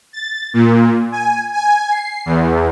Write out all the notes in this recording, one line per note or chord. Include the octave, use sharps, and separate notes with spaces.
A6
A#2
G#5
G#5
C7
E2